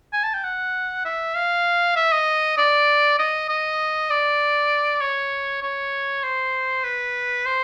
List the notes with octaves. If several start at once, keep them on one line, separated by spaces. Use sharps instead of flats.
G#5
A5
G5
F#5
E5
F5
E5
D#5
D5
D#5
D#5
D5
C#5
C#5
C5
B4
C5